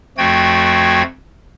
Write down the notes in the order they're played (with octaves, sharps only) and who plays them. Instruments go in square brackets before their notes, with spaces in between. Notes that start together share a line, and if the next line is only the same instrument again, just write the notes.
[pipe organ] F2 F3 A3 F#4 G5 G#6